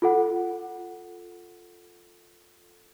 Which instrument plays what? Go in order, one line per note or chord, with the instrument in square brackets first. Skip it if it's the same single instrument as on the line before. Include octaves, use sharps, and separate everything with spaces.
[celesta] F4 A4 F#5